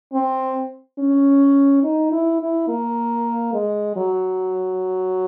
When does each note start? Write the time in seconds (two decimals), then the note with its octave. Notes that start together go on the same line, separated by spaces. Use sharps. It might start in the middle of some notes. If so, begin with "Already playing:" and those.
0.14 C4
0.99 C#4
1.84 D#4
2.12 E4
2.40 E4
2.68 A#3
3.53 G#3
3.96 F#3